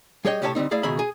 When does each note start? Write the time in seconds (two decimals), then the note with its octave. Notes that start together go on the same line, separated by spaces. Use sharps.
0.25 G3 G#4 C#5 D#5 G5
0.42 A2 C3 G4 C#5 D#5 A5
0.55 D3 G3 C4 D#4
0.71 A3 E4 G#4 D5 F5
0.83 C#2 B2 D#3 G#4 E5 B5
0.99 G#4 G#5